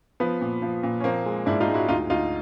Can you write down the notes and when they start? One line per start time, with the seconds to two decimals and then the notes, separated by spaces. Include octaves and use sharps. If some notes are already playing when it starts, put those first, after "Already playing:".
0.20 F3 B3
0.41 A#2
0.62 F3
0.83 A#2
1.00 C#4
1.04 F3 A#3 C4
1.26 G#3
1.46 G#2 D4 E4
1.60 D#4 F4
1.68 G#3
1.74 E4 F#4
1.88 D2 D#4 F4
2.10 D2 D#4 F4